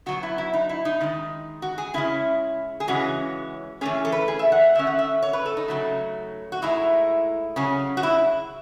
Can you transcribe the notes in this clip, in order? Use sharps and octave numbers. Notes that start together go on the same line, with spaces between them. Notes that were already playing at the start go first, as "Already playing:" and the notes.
B2 F#3 B3 F#4
E4
E4
D#4
E4
D#4
D#3 G#3 D#4
F#4
G#4
C#3 G#3 C#4 E4
G#4
C#3 E3 G#3 C#4 F#4
E3 A3 C#4 G#4
A4
B4
G#4
E5
F#5
F#5
D#3 A3 C#4 E5
F#5
E5
C#5
B4
A4
D#4
C#3 F#3 A3
F#4
A2 G#3 D#4 E4
C#3 F#3 C#4
F#4
E4